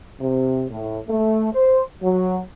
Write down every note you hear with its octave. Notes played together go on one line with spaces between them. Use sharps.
C3
A2
A3
C5
F#3